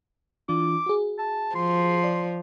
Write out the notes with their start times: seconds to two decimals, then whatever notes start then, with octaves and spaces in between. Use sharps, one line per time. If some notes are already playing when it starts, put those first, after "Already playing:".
0.49 E3 D4 F4 D6
0.86 F#4 G#4
1.19 A5
1.56 F3 C6
2.04 D5